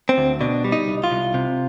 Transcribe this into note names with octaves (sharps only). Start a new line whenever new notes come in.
C4
D2
B2 D4
G3
D#4
C2
F4
C2
C3